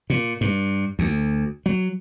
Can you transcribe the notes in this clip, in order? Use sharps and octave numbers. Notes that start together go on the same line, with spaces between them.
A#2
G2
D2
F#3